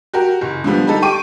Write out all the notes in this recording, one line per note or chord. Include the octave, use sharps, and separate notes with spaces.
F#4 G4 A#4
F#1
D3 F3 G3 B3
G3 D#4 A4
G5 C#6 D6 D#7